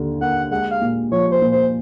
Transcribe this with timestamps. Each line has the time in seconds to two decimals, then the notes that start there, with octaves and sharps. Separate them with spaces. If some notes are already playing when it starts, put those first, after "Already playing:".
Already playing: D#2 D3
0.21 A#3 F#5
0.51 G#3 F#5
0.71 F5
0.82 A#2
1.12 F3 C#5
1.32 C5
1.42 A#2
1.52 C5